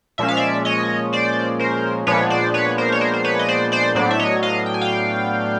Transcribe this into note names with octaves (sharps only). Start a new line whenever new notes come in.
A#2 F3 G#3 C#4 E5
F5
D5 E5
C#5 D#5
C5 D5
A#4 C5
A#2 F3 G#3 B3 D4 B4 C#5
C5 D5
B4 C#5
A#4 C5
C#5
A#4 C5
C5
B4 C#5
D#5
C5 D5
C5 D5
A2 F#3 B3 D4 C5 D5
E5
C#5 D#5
D#5 F5
G5
G#5
F5 G5